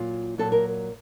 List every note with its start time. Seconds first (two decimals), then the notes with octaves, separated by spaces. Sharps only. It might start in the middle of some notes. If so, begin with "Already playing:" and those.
Already playing: A#2 F#3 F4
0.38 A#2 F#3 A4
0.52 A#4